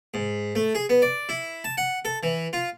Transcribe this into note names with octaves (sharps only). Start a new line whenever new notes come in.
G#2
A3
G#4
B3
D5
E4
A5
F#5
A4
E3
F4